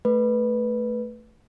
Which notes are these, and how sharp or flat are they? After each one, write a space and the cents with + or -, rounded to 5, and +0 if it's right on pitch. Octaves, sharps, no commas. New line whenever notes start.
A3 +0 B4 -5